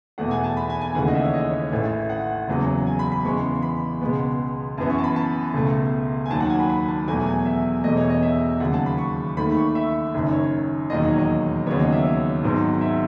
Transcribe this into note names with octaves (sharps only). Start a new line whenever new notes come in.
E2 B2 A3 F#5
G#5
A5
B5
G#5
G#5
D#2 C#3 E3 A3 F#5
D#5
E5
C#5
D#5
C#5
A1 A2 E3 A3
F#5
F#1 E2 C#3 F#3
G#5
B5
B5
E2 C#3 E3 G#3 B3 C#6
B5
C#2 B2 G#3 B3
F#2 E3 B3 A5
C#6
A5
B5
A5
C#2 B2 A3
G#5
D#2 D#3 F#3 A5
F#5
G#5
B5
B5
A5
E2 B2 F#3 A3 G#5
G#5
E5
E1 E2 B2 A3 D#5
C#5
D#5
E5
D#2 C#3 F#3 F#5
A5
B5
C#6
D#2 D#3 A3 B5
C#6
E5
F#1 F#2 D#3
C#5
E1 D#2 D#3 F#3 D#5
C#5
D#5
D#2 C#3 F#3 B3 C#5
D#5
E5
C#5
G#1 G#2 F#3 B3
E5